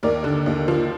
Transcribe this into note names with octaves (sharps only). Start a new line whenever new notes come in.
D#2 A#4 D5
D3
D#2
F3